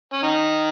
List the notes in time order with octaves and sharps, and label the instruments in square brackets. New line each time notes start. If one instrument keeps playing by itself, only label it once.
[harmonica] C#4
D#3 D#4